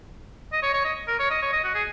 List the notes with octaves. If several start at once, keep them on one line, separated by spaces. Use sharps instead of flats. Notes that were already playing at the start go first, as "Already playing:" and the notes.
D#5
C#5
C#5
D#5
A#4
C#5
D#5
C#5
D#5
F#4
G#4